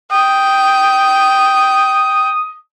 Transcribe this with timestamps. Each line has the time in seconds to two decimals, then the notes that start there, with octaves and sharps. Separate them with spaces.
0.12 G5 D#6